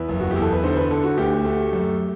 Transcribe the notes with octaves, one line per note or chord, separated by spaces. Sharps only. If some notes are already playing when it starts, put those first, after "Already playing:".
Already playing: E2 B4
F#1
F#4
G4
E2
A4
B4
D3 C5
B4
D3 A4
F#4
D2 G4
A3
F#2